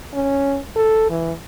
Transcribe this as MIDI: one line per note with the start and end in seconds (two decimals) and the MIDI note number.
0.13 0.59 61
0.76 1.09 69
1.10 1.32 52